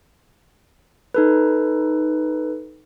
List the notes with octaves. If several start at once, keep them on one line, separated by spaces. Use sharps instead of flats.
D#4 A4 B4